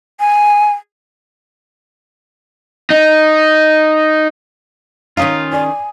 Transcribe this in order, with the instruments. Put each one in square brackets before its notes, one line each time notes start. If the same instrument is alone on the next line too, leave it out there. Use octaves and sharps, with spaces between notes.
[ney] G#5
[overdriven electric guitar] D#4
[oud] D#3 C#4 D#4 [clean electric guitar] F4 [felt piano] F5 D#6
[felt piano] D5 [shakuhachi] G#5